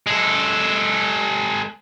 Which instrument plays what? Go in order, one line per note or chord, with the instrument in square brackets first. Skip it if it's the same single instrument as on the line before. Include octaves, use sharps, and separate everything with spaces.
[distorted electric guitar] G#3 A4